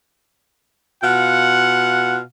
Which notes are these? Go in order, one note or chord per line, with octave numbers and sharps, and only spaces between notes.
B2 F4 F5 F#5